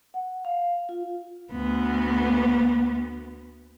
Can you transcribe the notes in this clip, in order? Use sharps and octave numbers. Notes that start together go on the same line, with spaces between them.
F#5
F5
F4
D2 B3